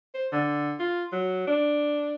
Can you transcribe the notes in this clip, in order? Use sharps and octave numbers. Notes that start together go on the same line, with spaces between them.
C5
D3
F4
F#3
D4